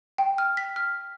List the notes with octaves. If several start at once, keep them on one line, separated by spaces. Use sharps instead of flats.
G5
F6
B6
F6